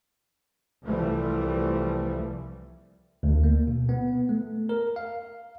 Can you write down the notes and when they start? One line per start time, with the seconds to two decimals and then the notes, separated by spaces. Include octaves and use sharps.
0.84 C2 E3 F3 G3 A3
3.23 D2
3.44 A#3
3.68 B2
3.89 B3
4.29 A3
4.69 A#4
4.96 F5